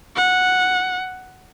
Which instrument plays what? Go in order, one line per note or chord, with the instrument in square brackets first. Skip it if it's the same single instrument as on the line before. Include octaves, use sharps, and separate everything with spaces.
[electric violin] F#5